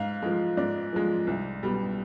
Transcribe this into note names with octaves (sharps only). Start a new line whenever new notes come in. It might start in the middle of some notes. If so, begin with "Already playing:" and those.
Already playing: G#2 F5
F3 G#3
G#2 D5
F3 G#3
C2
B2 G3